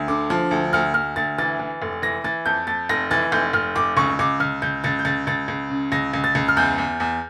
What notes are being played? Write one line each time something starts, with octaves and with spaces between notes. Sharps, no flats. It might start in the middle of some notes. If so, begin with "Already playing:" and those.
Already playing: D2
D3 D6
F3
D2
D2 F6
D2 F6
D2 A6
E3 A6
E3
F1
E3 A#6
E3 A6
F2 G6
F2 A6
F1 A#6
E3 A6
F1 G6
F1 F6
F1 D6
C#2 C#6
C#2 D6
C#2 F6
C#2 G6
C#2 A6
G6
C#2 A6
C#2 A6
C#2
C#3
C#2 A#6
C#2
A6
C#2
F6
E2 G6
E2
E2